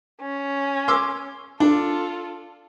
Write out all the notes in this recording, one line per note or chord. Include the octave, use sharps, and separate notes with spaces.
C#4
C6 D6 E6
D4 F4 A4